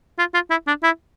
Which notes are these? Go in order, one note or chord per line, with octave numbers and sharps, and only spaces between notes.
F4
F4
E4
D4
E4